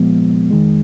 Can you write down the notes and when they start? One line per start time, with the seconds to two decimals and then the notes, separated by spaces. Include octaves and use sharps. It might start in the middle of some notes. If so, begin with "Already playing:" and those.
Already playing: A#2 F3 G#3 B3
0.50 F2 D#3 G#3